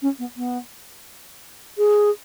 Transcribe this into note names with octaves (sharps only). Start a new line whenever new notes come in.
C#4
B3
B3
G#4